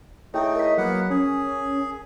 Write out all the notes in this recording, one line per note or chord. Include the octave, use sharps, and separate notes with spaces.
A3 D#4 E4 G#4 C#5 G5
A#4 D#5 B6
F#3 A#3 B3 F#5
C#4 G#4